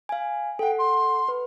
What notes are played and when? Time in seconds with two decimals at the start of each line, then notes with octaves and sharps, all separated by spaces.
0.09 F5 G#5
0.59 A4 F#5 G5
0.79 C6
1.28 B4